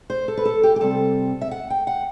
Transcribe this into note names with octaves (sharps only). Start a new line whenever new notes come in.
C5
A4
B4
A4
G4
G4
C3 G3 C4 A4
E5
F#5
G5
F#5